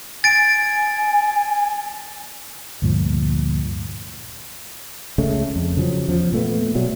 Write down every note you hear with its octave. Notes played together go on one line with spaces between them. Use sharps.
G#5 A6 D7
D2 G2 A#2 F3
C#2 C#3 G#3 A3
F2
C#3 F3 F#3
E2 F3
A#2 A3 B3
B2 F#3 G3 A3